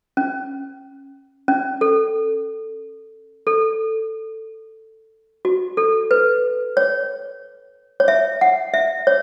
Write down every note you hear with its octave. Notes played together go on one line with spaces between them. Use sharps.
C#4
C#4
A4
A4
F#4
A4
B4
C#5
C#5
E5
F#5
E5
C#5